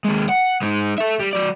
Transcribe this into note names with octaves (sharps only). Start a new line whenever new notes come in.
D#2 G#3
F#5
G#3 D#4
A4 E5
G3
F#3 D5